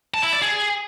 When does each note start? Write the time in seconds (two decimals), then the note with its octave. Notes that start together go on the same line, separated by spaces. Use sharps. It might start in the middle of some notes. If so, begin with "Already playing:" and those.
0.14 A5
0.23 E4
0.33 D5
0.42 G#4